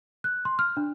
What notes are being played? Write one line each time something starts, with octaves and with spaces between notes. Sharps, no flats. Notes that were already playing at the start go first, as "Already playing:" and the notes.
F#6
C6
F6
D4